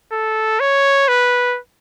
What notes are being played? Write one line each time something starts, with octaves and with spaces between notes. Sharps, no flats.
A4
C#5
B4